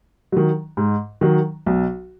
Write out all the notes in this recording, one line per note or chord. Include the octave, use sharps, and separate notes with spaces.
D#3 F#3
G#2
D#3 F#3
B1